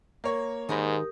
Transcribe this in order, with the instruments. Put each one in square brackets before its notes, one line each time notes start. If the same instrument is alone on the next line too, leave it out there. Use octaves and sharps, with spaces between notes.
[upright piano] A#3 C#5 [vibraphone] A#4
[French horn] G#2 [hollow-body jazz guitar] D#3 D#4 B5 [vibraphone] G4 A#4 D#6